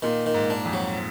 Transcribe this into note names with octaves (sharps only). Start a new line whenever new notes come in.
A#2 D#3
D#3
G#2
D4
F2
F#3